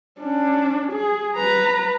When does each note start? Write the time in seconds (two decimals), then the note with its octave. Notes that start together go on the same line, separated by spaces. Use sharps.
0.20 C#4 D4
0.92 G#4
1.36 B4 A#5